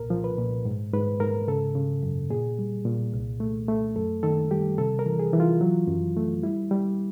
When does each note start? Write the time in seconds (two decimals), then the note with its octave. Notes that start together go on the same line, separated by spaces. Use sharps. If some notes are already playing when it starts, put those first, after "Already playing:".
Already playing: C2 A#2 A#4
0.10 F3
0.24 B4
0.38 A#2
0.65 G#2
0.93 G#2 B4
1.20 G#2 A#4
1.48 C#3 A4
1.75 C#3
2.03 F#2
2.30 A#2 G#4
2.59 G3
2.85 A#2
3.13 C2
3.40 A3
3.68 A3
3.96 F#2 A4
4.23 D#3 A4
4.50 G3 G4
4.78 C3 A4
4.99 A#4
5.06 E3
5.19 G#4
5.33 E3
5.40 F4
5.61 F#3
5.88 F#2
6.16 A3
6.43 G3 E4
6.71 G3